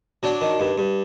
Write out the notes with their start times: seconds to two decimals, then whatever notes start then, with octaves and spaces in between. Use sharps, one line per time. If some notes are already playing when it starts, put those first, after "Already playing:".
0.23 F#3 D4
0.41 D#3
0.60 G2
0.78 G2